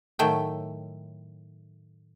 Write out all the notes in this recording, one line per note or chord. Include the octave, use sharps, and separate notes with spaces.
A2 D#3 F#3 A3 E4 G5